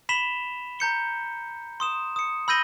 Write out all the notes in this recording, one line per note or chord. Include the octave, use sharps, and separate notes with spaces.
B5 B6 E7 F7 G7
A#5 G6 C#7 G7
C6 D#6 E7
D#6 C#7
B5 E6 G6 A#6 D#7 G7